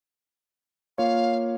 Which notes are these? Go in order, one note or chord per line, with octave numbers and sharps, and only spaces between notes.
A#3 F4 C#5 F5